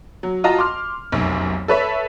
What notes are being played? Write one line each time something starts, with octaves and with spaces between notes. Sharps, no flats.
F#3
F4 F#4 D#5 A5 A#5
C6 D6 F6
F1 B1 F#2
A4 B4 C#5 E5